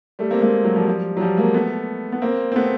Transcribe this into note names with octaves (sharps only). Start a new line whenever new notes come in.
G3 A3
A#3 C4
G#3 A#3
F#3 G#3
F3 G3
F3 G3
F#3
F3 G3
G#3 A#3
A3 B3
B3
A#3 C4
C4
A3 B3